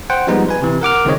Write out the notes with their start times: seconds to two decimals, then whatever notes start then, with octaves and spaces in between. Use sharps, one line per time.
0.10 C5 F#5 G5
0.27 F3 G3 G#3 B3 D#4
0.49 B4 G#5
0.62 C3 E3
0.81 A#4 F#5 D6 F6
1.05 C#2 D#3 G#3 C4 C#5 D#5